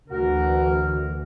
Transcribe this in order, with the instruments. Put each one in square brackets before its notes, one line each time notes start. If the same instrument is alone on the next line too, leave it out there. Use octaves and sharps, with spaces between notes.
[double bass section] D2 E3 [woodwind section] F#4 A#4